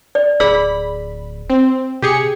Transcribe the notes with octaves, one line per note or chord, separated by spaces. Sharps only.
D5
D1 G#4 D5 B5 E6
C4
C3 G4 G#4 C#7